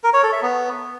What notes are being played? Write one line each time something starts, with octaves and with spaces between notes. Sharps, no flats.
A#4
C#5
A4
E5
B3